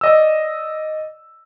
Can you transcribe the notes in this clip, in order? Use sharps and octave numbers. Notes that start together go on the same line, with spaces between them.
D5 D#5 E6